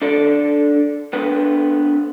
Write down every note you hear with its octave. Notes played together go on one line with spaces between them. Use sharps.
D4 A4 D5
B3 C4 D4 A4 B4